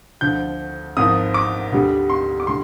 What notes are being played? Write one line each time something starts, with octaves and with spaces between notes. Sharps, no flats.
D2 D3 F3 G6
G#1 G#2 F3 D#6
D6
D2 D3 G3
C6
D6
D3 G3 C6